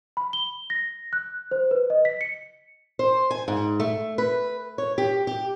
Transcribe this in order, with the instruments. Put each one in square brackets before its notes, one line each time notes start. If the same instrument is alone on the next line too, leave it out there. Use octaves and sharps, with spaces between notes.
[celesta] B5
G7
A#6
F#6
C5
B4
D#5
B6
C#7
[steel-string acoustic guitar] C5
G#5
G#2
A3
B4
C#5
G4
G4